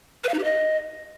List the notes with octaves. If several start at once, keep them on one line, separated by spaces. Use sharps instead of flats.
B4
F5
D#4
G4
D#5